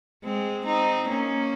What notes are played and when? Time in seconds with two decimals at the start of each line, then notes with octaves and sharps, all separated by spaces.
0.24 G#3 C4
0.66 C4 D#4
1.09 A#3 C#4